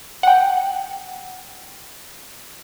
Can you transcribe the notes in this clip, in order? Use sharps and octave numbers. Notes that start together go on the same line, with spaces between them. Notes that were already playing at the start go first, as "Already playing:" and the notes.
F#5 G5